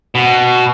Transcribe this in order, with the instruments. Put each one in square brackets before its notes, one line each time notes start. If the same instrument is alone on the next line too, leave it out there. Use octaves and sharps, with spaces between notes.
[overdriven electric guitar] B2